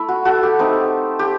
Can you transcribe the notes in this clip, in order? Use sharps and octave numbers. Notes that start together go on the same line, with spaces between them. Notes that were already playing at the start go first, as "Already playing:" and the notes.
Already playing: A3 E4
F#4
F#4 A4
G4
A3 C4 D#4
G4